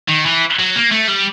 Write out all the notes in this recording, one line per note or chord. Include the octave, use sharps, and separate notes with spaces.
D#3
E3
F#3
A#3
A3
G3